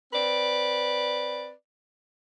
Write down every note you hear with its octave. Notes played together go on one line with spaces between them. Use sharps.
C4 B4 D5